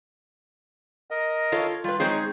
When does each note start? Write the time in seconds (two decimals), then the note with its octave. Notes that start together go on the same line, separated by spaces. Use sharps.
1.11 A#4 D#5
1.52 F4 A4 C#5
1.84 G3 F4 B4
2.00 G#3 C4 D#4 G#4 C5 C#5